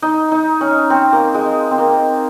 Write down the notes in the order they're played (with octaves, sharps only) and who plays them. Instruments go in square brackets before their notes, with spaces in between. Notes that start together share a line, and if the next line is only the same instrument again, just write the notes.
[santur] D#4
D#4
C#4
C4
A#3
G#3
C4
A#3